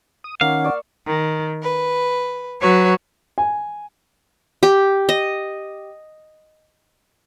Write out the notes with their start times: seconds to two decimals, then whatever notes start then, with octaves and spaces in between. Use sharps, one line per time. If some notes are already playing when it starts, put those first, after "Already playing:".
0.24 D#6
0.41 D#3 A#3 C#4 F5 F#5
0.64 D5 C#6 E6
1.06 D#3
1.62 B4
2.60 F#3 F#4 B4 C#5
3.38 G#5
4.63 G4
5.09 D#5